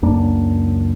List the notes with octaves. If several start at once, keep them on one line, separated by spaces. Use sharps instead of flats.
C#2 F#2 A#3 D4